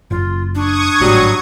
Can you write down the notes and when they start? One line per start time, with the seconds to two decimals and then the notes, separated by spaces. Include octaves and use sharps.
0.11 F#1 F4
0.55 D4 C#6 D#6 G#6
1.00 G#1 A2 F#3 G3